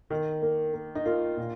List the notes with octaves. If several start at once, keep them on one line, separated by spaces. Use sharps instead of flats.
D#3
A#3
A#3
D#4
A#3 F4
A#2